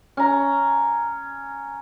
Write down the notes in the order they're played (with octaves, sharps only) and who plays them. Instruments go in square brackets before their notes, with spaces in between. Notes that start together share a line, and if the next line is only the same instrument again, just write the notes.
[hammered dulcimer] C#4 A#5